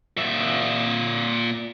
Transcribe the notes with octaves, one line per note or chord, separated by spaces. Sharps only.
A#2 E5